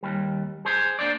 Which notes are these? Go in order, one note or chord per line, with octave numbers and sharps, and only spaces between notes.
D#2 G3
G#4 C5
A#3 D4 C5 D5